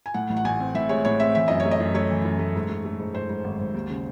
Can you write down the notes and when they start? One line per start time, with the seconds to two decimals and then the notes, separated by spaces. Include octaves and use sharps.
0.06 G#5
0.14 A2 F#5
0.30 A1
0.37 F#5
0.44 A1 G#5
0.60 C4
0.75 A2 E5
0.89 G#3 C#5
1.05 A2 C#5
1.20 C4 E5
1.35 E3 E5
1.48 F#2 D#5
1.60 C#5
1.65 A3
1.71 D#5
1.80 F#2
1.94 A3 C#5
2.10 E3
2.25 F#2
2.39 A3
2.55 G#2
2.69 A3
2.85 A3
2.99 G#2
3.14 G#2 C5
3.29 G#2
3.44 G#1
3.59 G#1
3.74 D#2
3.90 C#3